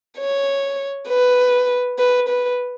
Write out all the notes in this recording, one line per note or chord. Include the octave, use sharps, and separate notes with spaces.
C#5
B4
B4
B4